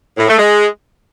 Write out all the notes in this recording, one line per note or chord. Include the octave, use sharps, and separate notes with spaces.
A2
A3
G#3